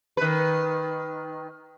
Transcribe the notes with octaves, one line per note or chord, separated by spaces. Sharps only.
D#3 B4